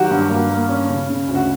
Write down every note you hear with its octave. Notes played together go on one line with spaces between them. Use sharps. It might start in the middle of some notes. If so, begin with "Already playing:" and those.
Already playing: D#3 F#3 F#4 G4
G2
A#3
A#3
C#4
C#3
C#3
D2
F#4